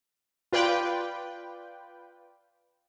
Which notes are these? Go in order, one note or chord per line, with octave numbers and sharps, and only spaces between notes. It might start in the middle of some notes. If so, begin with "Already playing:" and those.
F4 B4 D5 G5